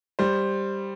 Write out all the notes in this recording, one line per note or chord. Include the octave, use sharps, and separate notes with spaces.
G3 C5